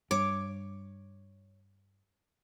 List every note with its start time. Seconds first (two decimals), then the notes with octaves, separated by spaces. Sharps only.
0.11 G2 C#5 D6